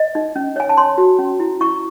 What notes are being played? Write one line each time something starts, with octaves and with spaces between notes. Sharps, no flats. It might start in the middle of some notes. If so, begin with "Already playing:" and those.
Already playing: D#5
D#4
C#4
C#5 G#5
A5
C#5 C6
F#4
C#4
E4
E4 C#6